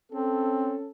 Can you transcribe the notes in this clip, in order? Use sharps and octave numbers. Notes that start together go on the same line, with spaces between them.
C4 C#4 A4